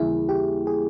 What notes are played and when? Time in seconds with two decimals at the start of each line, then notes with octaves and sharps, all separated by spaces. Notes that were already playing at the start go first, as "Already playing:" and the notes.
Already playing: D#2 C#3 E3 G3 A#3 E4 G#4
0.29 G4
0.67 G#4